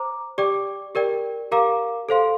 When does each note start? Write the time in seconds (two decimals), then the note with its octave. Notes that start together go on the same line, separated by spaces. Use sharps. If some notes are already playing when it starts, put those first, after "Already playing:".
Already playing: C5 A#5 D6
0.38 G4 D5 G5 D6
0.95 G4 A#4 D5 G5
1.51 G4 A#4 F5 A#5 D6
2.09 A4 C5 F5 C6